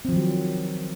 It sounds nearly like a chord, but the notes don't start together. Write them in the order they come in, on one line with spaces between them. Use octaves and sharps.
C4 F3 D#3 F#3